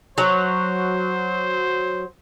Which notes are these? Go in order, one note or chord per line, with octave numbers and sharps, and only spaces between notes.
F#3 C5